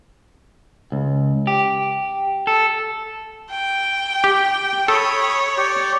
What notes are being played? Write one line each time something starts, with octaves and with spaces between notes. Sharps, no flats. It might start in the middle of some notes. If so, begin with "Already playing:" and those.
C#2
G4
A4
G5
G4
A4 C#5 B5 D#6
G4 D5 G5